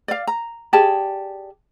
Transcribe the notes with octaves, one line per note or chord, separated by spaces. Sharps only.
D5 F5
A#5
G4 G#4 D5 A5